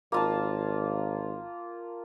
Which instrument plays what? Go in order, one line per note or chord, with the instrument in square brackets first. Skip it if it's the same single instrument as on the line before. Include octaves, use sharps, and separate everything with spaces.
[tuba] G#1 [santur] A#3 F4 A5